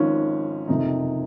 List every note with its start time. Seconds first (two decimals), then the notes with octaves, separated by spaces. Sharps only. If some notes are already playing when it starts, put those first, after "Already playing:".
Already playing: G#1 G#2 F3 C#4
0.68 F#1 F2 C3 D#4